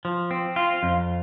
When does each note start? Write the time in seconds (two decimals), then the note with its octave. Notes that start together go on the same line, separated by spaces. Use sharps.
0.05 F3
0.31 C4
0.56 F4
0.83 F2